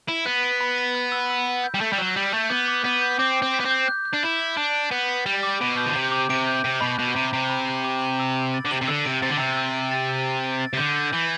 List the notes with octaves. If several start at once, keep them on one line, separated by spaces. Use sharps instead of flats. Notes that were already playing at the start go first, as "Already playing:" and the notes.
E4 B6
B3 F#6
D7
B5
B6
F#6
E6
E6
B6
G6
G3
A3 E6
G3
F#3 E6
G3 B6
A3 G6
B3 D6
D6
B3 B6
G6
C4 D6
D6
C4
B6
B3
C4
G6
F#6
F#6
D4
E4 F#7
B6
D4 F#6
F#6
B3 F#7
B6
G3 F#7
D6
B2 D7
G6
D3
C3 F#7
D6
C3 D7
G6
C3 B6
B2 B5
B2 F#6
C3 D6
C3 B6
B5
F#6
D6
F#7
E6
D7
A6
D3
C3 F#7
C3
D3 E6
C3 D7
C3 A6
D3
C3 E6
E6
D7
A6
E6
E6
D7
A6
C3
D3 G6
G6
E3 F#7